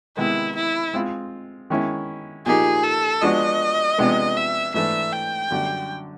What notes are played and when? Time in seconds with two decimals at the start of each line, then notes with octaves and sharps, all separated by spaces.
0.17 C3 D#3 G#3 B3 E4
0.55 E4
0.94 G#3 C4 F4
1.70 D#3 G#3 C#4 E4
2.46 A#2 F3 A#3 D#4 G4 G#4
2.83 A4
3.22 F3 G#3 B3 D4 F#4 D#5
3.98 C3 F3 G#3 B3 D4
4.36 E5
4.74 G#2 E3 A3 D4 E5
5.12 G5
5.50 F#2 D3 G3